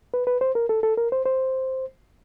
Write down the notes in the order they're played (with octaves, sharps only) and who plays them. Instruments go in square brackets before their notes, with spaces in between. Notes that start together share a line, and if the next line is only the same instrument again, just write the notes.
[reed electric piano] B4
B4
C5
A#4
A4
A4
A#4
C5
C5